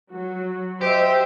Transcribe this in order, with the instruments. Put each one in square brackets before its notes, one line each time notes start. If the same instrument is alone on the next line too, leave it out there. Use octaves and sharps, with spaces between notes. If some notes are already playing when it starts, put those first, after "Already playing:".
[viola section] F#3 F#4
[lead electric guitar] G4 [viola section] C5 D#5 E5